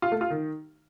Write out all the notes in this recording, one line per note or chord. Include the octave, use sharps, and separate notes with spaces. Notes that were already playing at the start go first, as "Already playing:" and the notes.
F4
A3
F4
D#3